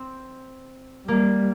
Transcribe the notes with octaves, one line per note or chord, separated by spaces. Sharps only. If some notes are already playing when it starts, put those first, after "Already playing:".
Already playing: C4
G3 A#3